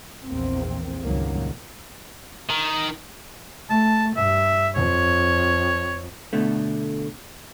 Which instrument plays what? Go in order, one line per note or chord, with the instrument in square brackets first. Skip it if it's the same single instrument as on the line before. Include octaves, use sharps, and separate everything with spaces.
[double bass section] A#1 E2 A#3 C4
C#2 G2 A#2 D#3 F#3 A#3
[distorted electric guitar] D#3
[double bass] A3 [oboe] A5
[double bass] G2 [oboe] E5
[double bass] F2 [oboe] C#5
[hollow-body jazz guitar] B2 D3 A3